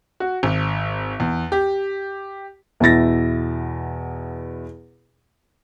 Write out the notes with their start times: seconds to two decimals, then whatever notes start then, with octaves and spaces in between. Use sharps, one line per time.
0.20 F#4
0.43 G#1
1.20 E2
1.52 G4
2.80 E2 B2 E4 A6 A#6